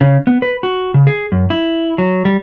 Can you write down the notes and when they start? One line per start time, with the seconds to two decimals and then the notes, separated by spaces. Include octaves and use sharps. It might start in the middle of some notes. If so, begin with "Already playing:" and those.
0.01 C#3
0.27 B3
0.42 B4
0.63 F#4
0.94 C#3
1.07 G#4
1.32 F#2
1.50 E4
1.98 F#3
2.25 G3